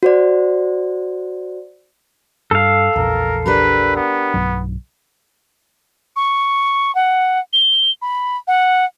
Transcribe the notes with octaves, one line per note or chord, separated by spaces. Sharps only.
F#4 C5 D5
G2 A4 F5
A#1 E2 E3 A#4
D4 G4 A#4 B4
B3
B1 G2 F#3
C#6
F#5
G7
B5
F#5